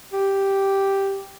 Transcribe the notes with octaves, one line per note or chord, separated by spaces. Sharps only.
G4